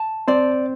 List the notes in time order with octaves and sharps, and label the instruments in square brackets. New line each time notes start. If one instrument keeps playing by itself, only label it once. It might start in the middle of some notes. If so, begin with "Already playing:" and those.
Already playing: [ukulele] A5
[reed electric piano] C4 C5 [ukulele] D5